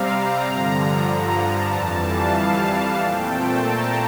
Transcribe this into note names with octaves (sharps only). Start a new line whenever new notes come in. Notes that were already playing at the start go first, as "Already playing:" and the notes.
Already playing: C3 G3 C4 F5 A#5
G2 D3 F3
A5
F2 E3 G3 A5
F5
A#2 A3 C4 G5
A5
A#5